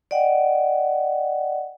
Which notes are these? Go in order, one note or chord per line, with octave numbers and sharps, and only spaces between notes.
D5 D#5 F#5 G5